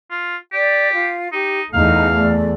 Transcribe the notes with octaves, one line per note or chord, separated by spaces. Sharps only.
F4
G4 D5
F4
D#4 G4
E2 A3 D#4 D#5 F5 A#5
D5